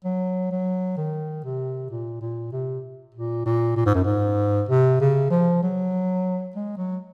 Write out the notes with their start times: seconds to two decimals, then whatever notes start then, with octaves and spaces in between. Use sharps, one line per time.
0.05 F#3
0.52 F#3
0.97 D#3
1.44 C3
1.91 A#2
2.21 A#2
2.53 C3
3.15 A#2
3.46 A#2
3.77 A#2
3.86 G#2
3.95 F#2
4.05 G#2
4.69 C3
5.00 C#3
5.31 F3
5.63 F#3
6.55 G#3
6.78 F#3